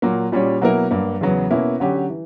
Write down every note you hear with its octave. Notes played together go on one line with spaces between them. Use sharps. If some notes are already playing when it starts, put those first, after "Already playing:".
A#2 F#3 A#3
A#2 G3 C#4 F#4 C#5
B2 F#3 A#3 E4 A#4
G2 F#3 A#3
E2 C#3 F#3 B3
B2 A#3 C#4 E4
D3 F#3 C#4 G4
E3